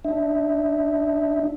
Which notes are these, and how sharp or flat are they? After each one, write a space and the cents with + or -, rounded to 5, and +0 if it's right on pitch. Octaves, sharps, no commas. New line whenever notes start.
D4 +0 E5 -20